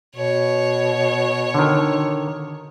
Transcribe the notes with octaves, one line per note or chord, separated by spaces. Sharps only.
B2 C#5
D3 D#3